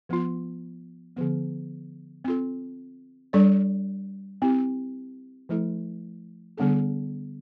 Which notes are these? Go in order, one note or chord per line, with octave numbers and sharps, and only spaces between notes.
F3 B3 F4
D3 F3 B3
C4 F4 A4
G3 D4 A4 D5
C4 E4 G4
F3 A3 E4 A4
D3 G3 B3 D4 A4